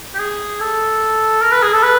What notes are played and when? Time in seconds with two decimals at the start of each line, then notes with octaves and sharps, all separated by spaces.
0.14 G4
0.19 G#4
0.60 A4
1.42 A#4
1.52 B4
1.62 G#4
1.73 A4
1.83 B4